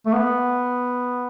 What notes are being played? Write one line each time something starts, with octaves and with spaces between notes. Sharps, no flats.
A3
B3